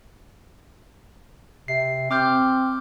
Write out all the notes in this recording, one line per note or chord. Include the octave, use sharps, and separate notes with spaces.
C3 C7
C4 D6 F6 G6